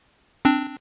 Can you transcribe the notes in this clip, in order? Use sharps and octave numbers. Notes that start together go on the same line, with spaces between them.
C4 D4